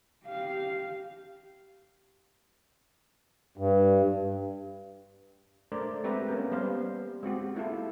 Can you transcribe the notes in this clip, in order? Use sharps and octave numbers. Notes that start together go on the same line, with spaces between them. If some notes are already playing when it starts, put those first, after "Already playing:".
G4 F5
G2
A3 D4 A#4 C5 D5
G#3 C4 G4 B4 E5 A#5
A#3 B3 C#4
G3 B3 C5 F5
G#3 C4 F#4 G4
A#3 E4 F4 A4